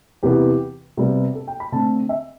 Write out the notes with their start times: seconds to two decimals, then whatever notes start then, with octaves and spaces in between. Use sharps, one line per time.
0.23 E2 C3 E3 B3 G4
0.97 C3 G3 B3
1.35 A4
1.47 G5
1.60 B5
1.72 D3 A3 C4 A5
2.09 E5